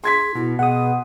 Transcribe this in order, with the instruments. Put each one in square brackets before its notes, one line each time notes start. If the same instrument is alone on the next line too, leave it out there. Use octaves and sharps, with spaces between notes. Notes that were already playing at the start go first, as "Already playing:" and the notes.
[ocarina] G#4 [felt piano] C6 G#6 B6
[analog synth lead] B2 [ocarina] E4
[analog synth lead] B2 [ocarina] G#4 [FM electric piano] F#5 D#6